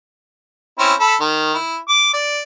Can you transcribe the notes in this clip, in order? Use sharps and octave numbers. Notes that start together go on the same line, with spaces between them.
C4 C#4 E4
A4 B5
D#3
E4
D6
D5